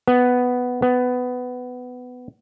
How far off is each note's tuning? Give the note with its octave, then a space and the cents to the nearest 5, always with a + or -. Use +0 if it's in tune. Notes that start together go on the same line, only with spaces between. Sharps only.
B3 +5
B3 +15